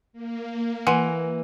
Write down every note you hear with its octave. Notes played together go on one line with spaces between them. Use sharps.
A#3
E3 F#5 G#5 C6